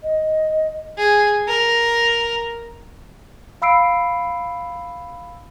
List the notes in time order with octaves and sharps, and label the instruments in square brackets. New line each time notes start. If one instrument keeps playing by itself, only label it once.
[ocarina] D#5
[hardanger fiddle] G#4
A#4
[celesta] F5 B5 E6 C7 D7